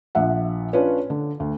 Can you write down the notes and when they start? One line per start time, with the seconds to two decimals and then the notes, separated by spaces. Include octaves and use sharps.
0.15 A#1 F3 E5 F#5
0.73 C#4 D4 F4 B4 C#5
1.10 D3
1.40 D2